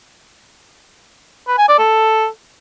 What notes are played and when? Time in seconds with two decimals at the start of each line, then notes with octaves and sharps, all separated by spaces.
1.48 B4
1.58 G#5
1.68 D5
1.79 A4